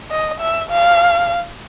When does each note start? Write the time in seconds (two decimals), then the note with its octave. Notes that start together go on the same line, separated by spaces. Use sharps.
0.11 D#5
0.41 E5
0.70 F5